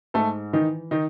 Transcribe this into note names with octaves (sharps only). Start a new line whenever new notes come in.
G#2 A3 A4
D#3 E3 D#4
D#3 D#4